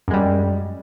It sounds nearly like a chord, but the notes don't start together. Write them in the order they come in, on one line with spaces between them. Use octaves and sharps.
F#2 G#3 G3